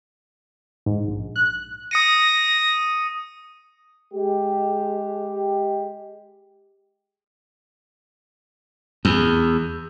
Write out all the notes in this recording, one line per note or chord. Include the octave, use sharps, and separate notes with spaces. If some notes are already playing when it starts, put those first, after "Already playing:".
G#2
A#1
F#6
D#6 A#6 C#7 D#7
G#3 G4
E2